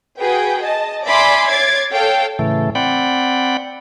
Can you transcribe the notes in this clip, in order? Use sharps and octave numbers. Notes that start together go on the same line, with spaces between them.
F#4 G#4 B4 G5
D#5 A5
D5 E5 G#5 B5 C6 D6
C#5 D6 G#6 A6 C7
A4 C#5 F5 G5
A2 C#3 E3 A3
C4 D5 F#5 G5 B5